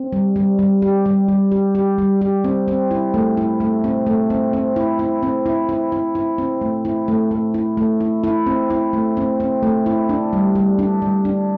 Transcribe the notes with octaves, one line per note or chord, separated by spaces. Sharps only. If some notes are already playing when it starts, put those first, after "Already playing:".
Already playing: C4
G3
G3
G3
G4
G3
G3
G4
G4
G3
G4
C4
C4
E4
A3
E4
A3
C4
A3
C4
C4
E4
E4
C4
E4
E4
E4
E4
C4
A3
E4
A3
A3
E4
A3
E4
E4
C4
E4
A3
C4
C4
A3
E4
D4
G3
G3
D4
G3
D4